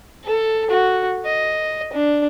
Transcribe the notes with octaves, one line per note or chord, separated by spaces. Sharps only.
A4
F#4
D#5
D4